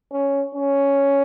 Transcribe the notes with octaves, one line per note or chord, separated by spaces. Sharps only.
C#4
C#4